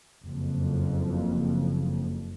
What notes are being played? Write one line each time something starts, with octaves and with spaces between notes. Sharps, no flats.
F#1 F2